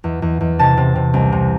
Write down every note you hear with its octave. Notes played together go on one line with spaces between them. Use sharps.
E2
E2
E2
C3 A5
C3
C3
C2
C3